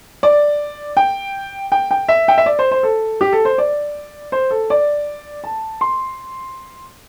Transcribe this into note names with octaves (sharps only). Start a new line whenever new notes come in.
D5
G5
G5
G5
E5
G5
E5
D5
C5
C5
A4
G4
A4
C5
D5
C5
A4
D5
A5
C6